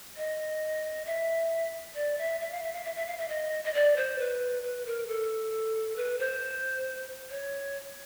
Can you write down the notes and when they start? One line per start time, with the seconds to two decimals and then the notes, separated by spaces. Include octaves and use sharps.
0.17 D#5
1.06 E5
1.95 D5
2.18 E5
2.40 E5
2.51 F5
2.63 E5
2.73 F5
2.84 E5
2.95 E5
3.07 F5
3.18 E5
3.28 D#5
3.64 D#5
3.74 D5
3.96 C5
4.19 B4
4.63 B4
4.86 A#4
5.07 A4
5.96 B4
6.19 C5
7.30 C#5